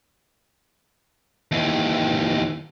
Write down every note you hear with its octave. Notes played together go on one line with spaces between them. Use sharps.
D#2 E3